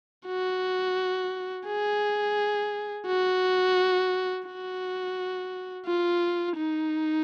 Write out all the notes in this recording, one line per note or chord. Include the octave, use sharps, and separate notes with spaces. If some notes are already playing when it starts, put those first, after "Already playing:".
F#4
G#4
F#4
F#4
F4
D#4